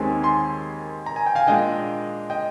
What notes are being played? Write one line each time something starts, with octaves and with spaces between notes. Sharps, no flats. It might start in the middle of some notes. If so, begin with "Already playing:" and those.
Already playing: D#2 D#3 G#3 C4 G#5
G#5 C6
A#5
G#5
G5
F5 G#5
A#2 G#3 D4 D#5 G5
D#5 G5